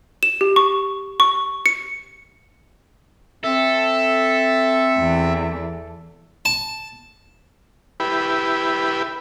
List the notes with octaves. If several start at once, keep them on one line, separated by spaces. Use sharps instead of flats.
E7
G4
C#6
C#6
C#7
C4 A4 E5
E2
A5
E4 G4 B4